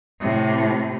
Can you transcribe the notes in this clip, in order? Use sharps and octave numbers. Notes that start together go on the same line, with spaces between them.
A2 C3